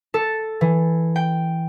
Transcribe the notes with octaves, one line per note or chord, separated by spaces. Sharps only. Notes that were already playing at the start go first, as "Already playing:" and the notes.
A4
E3
G5